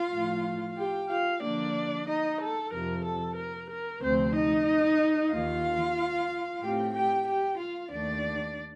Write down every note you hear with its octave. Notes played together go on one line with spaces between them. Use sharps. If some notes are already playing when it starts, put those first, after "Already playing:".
Already playing: F4 F5
A2 F3 A3
G4 G5
F4 F5
D3 F3 A#3 D4 D5
D#4 D#5
A4
F2 C3 F3 A#4
A4
A#4
A#4
D2 C3 F3 A3 C4 C5
D#4 D#5
D#2 D#3 A#3 F4 F5
A2 A3 C4 G4 G5
G4 G5
G4 G5
F4 F5
D#2 D#3 A3 D4 D5